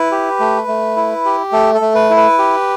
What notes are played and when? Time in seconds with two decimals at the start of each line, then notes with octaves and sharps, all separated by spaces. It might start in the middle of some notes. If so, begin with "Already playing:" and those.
Already playing: E4 B4
0.12 G4
0.40 A3
0.68 A3
0.96 E4
1.25 G4
1.52 A3 A4
1.74 A4
1.81 A3
1.95 B4
2.10 E4
2.17 B4
2.38 G4